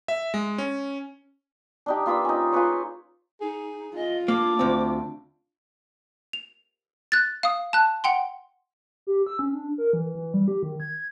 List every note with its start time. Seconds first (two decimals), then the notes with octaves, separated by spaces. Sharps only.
0.08 E5
0.34 G#3
0.58 C#4
1.86 D4 D#4 G4
2.06 A#3 F4 B4 E6
2.25 C#4 D#4
2.53 F4 G#4 B4 C#5
3.41 D#4 G#4
3.95 F4 D#5
4.28 A#3 D4 D6
4.59 D2 C4
6.33 F7
7.12 F#6 A6
7.43 F5 D#6
7.73 A5 F#6
8.04 F#5 G5 C6
9.07 G4
9.27 E6
9.39 C#4
9.53 D4
9.78 A#4
9.93 E3
10.15 E3
10.34 G3
10.48 G4
10.63 D#3
10.80 G#6